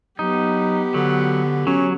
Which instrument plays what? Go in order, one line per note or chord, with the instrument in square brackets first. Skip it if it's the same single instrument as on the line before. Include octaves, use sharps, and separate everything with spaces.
[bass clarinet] F#3 [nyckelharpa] B3 G4 [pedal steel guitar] D#4
[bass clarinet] D3 [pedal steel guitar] F#3
[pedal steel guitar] F#3 [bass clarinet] C#4